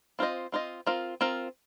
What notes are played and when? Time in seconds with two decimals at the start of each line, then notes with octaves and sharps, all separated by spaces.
0.19 C4 F4 C5 D#5
0.52 C4 F4 C5 D#5
0.87 C4 F4 A#4
1.21 C4 F4 A#4